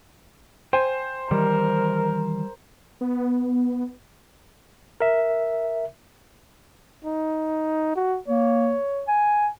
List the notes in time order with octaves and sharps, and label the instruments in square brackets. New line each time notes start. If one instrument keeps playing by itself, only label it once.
[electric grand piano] C5 [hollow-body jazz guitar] G5 G#5
[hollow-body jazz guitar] D#3 E3 [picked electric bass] G3 [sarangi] A#4
[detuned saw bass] B3
[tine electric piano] A#4 E5
[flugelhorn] D#4
F#4
[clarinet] A#3 [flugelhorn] C#5
[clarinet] G#5